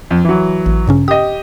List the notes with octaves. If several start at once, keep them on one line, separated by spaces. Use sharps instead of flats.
F2
E3 F#3
A1
G2 C#3 C#4
G4 D#5 D#6